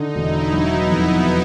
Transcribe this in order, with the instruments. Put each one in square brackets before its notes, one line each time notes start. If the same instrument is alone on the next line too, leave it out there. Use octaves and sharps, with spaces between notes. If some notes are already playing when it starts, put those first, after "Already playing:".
Already playing: [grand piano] D3 [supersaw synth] D#4
[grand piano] E1 [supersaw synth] E4
[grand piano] F#3 [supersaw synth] B3
[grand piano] F2